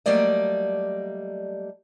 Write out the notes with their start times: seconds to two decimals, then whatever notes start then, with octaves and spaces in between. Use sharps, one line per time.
0.06 F#3 G3 A3 A#3 D5 D#5